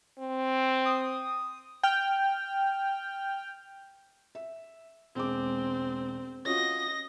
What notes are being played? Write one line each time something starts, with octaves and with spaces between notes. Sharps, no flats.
C4
D#6
G5 F6
E5
E1 G#3 C4 D6
C#4 F4 F#4 D#5 A#6